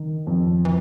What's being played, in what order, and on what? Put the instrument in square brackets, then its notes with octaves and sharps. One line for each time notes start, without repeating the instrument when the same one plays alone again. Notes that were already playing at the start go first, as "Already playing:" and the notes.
Already playing: [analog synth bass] D#3
[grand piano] F2
[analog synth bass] E3